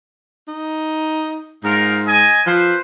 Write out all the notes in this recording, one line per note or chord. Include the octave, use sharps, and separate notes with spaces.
D#4
G#2 D#4 F4 A#4
D#5 G#5
F3 B4 C5